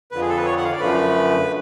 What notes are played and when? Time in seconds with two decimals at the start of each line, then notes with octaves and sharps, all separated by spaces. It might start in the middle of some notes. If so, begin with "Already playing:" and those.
0.12 F2 D3 F3 B4
0.21 G#4
0.29 A4
0.37 B4
0.46 C#5
0.57 F#5
0.64 F5
0.72 D5
0.80 F#2 D3 F3 A3 B4